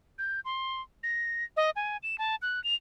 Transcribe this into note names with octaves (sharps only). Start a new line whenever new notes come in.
G6
C6
A#6
D#5
G#5
E7
A5
F#6
F7